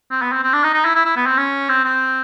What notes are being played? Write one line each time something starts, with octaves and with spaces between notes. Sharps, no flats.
C4
B3
C4
C4
D4
D#4
D#4
E4
E4
E4
B3
C4
C#4
C4
C4